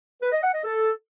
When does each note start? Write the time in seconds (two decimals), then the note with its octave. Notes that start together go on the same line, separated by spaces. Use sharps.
0.21 B4
0.32 D#5
0.42 F#5
0.53 D#5
0.64 A4